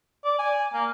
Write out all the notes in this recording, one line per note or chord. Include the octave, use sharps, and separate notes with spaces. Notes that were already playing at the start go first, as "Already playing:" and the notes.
D5
G#5
A#3